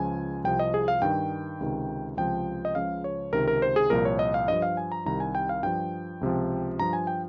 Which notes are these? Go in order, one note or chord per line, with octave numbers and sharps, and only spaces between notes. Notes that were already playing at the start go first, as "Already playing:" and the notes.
Already playing: C#2 C#3 F3 G#5
C2 C3 F3 G5
D#5
G#4
F5
G2 D#3 G5
C#2 C3 D#3
C#2 C3 F3 G5
D#5
C#2 C#3 F3 F5
C#5
C#2 C3 D#3 A#4
A#4
C5
G#4
C2 A#2 F3 A#4
C#5
D#5
F5
G2 F3 D#5
F5
G#5
A#5
C2 C3 D#3 A#5
G#5
G5
F5
G2 F3 G5
C#2 C3 F3
G2 F3 A#5
G#5
G5